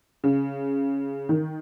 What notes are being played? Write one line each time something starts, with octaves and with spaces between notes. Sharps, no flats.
C#3
D#3